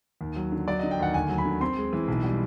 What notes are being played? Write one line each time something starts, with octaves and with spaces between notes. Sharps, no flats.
D#2
F#3
D3
F#3 D5
D#5
D3
G5
D#2 F#5
D2 G#5
F#3
B5
D3
C4 C6
G#3
E3
B1
G3